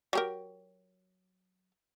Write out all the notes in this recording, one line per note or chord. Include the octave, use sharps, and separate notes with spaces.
F#3 G4 A#4